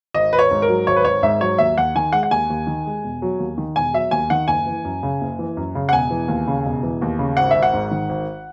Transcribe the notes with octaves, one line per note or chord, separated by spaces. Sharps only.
G#1 D#5
G#1 B4
C#5
G#2
A#4
F#3
G#1 C#5
B4
G#1 C#5
G#2 E5
F#3 C#5
D#2 E5
D#2 F#5
D#3 G#5
G#3 F#5
F#5
D#2 G#5
D#2
D#3
G#3
E1
F#3
D#2
D#3
E1 G#5
F#3 E5
D#2 G#5
D#3 F#5
F#1 G#5
E3
F#2
C#3
F#1
E3
F#2
C#3
F#5
E1 G#5
E3
D#2
C#3
E1
E3
D#2
C#3
G#1 F#5
G#1 E5
F#5
G#2
D#3
G#1